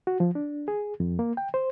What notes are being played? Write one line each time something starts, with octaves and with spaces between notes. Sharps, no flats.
F#4
F3
D4
G#4
F2
A#3
G5
C5